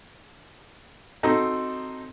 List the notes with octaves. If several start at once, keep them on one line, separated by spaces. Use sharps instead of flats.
C4 D#4 F#4 A4 D#5 A#5